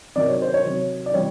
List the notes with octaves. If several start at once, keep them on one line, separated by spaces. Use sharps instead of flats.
C3 D#3 F#3 D5
C#5
C5
C#5
C3 D#3 F#3
D5
C3 E3 G3 C#5